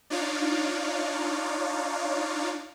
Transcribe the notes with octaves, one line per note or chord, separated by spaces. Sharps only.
D4 D#4 F4 C#5 D5 F5